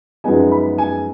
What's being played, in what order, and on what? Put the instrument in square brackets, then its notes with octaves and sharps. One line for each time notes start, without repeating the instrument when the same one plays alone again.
[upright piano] F#2 F3 G#3 B3 D#4 G#5
B5
G#5